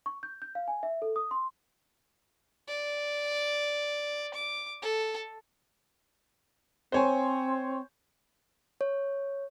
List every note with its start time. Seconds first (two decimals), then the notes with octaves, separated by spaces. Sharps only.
0.06 C#6
0.23 G6
0.42 G6
0.55 F5
0.68 G#5
0.83 E5
1.02 A4
1.16 D#6
1.31 C6
2.68 D5
4.34 D6
4.82 A4
6.92 C4 C5 C#5 G#5
8.81 C#5